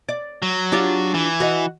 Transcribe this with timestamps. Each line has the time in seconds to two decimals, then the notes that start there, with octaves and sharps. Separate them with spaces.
0.09 D5
0.42 F#3
0.72 D4 F4 G4
1.14 E3
1.40 F#4 D#5